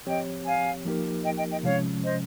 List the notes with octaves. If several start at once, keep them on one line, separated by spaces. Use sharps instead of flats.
F3 C4 G4 C#5 D#5 G5
F5 G#5
F3 A#3 D#4 G4 A#4
D#5 G5
D#5 G5
D#5 G5
C3 F3 G#3 C#4 C#5 F5
C5 D#5